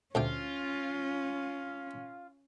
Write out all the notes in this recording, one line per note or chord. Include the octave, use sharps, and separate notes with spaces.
D2 C3 C#4 F4 G5